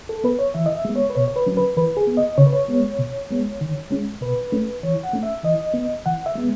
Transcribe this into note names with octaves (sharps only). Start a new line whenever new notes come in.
A4
B3 B4
C#5
E3 E5
D#5
E5
G#3 B3
C#5
B4
B2 C#5
C#5
B4
F#3 C#4
B4
E3 B4
G#4
B3
D#5
C#3 C#5
B4
C#5
G#3 B3
B2
G#3 B3
D#3
G#3 C#4
B2 B4
A3 C#4
E3 C#5
F#5
A3 C#4
E5
E3 D#5
B3
E3 F#5
E5
G#3 B3